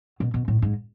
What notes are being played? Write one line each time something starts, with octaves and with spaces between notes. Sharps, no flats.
B2
B2
A2
G#2